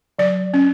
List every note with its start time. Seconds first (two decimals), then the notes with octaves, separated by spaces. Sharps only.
0.19 F#3 D5
0.54 C#4